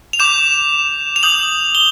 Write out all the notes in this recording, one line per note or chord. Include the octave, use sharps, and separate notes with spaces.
F7
D6 G6 E7
F7
D#6 G6 F#7
G7